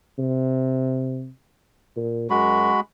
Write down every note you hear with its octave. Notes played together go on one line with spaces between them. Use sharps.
C3
A#2
F#2 G#3 F#4 B5